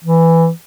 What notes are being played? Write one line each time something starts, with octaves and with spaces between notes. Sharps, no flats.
E3